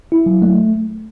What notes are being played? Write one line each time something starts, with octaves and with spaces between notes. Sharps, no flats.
E4
F#3
A3